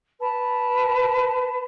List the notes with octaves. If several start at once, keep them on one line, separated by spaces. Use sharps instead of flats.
B4 A5